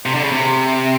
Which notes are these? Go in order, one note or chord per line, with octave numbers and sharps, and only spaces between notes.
C3
D3
C#3
C3